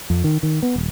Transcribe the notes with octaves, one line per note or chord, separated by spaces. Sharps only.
F2
D#3
D#3
B3
D#1